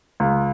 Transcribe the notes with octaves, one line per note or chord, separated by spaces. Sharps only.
C#2